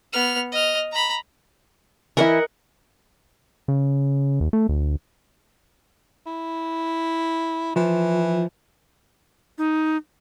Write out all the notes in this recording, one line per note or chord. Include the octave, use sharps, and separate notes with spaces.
B3 F6
D#5 F6
A#5 B5
E3 E4 A#4 D#5 F#5
C#3
D#2
A3
D2
E4
E3 F3
D#4